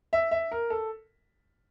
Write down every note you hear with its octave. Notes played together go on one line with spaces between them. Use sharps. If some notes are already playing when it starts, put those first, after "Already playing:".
E5
E5
A#4
A4